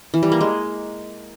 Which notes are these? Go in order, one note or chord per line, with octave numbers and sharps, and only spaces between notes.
E3
G3
A#3
G#3